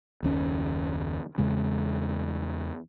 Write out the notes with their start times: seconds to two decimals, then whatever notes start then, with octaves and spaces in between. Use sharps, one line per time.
0.23 F#1 D#2 C#4
1.38 E2 C#3 G#3 C#4